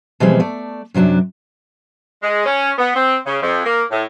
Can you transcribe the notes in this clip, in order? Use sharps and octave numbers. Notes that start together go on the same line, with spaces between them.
B2 E3 F3 G3 G#3 C4
A3 D5
F#2 C3 F#3 D4
G#3
C#4
B3
C4
C#3
F2
A#3
A2